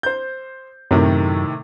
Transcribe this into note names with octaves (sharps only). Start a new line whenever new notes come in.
C5 G6
F#2 A2 C3 D#3